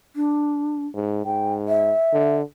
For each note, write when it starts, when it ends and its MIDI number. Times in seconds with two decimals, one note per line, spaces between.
0.16 0.87 62
0.95 1.23 44
1.25 1.92 44
1.25 1.54 79
1.68 2.37 76
2.13 2.42 50